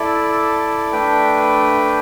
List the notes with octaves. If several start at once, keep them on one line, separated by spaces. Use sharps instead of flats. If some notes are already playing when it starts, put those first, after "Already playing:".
Already playing: E4 A4 D5
A3 D4 B4 G5